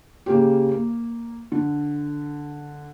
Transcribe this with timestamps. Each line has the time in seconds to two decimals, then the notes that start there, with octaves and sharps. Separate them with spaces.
0.26 C#3 A#3 G4
0.71 A#3
1.52 D3